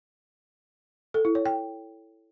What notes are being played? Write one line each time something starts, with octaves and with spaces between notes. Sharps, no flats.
A4
E4
C#5
G5